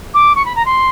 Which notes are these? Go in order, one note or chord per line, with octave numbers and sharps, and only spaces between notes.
D6
C#6
B5
A#5
C6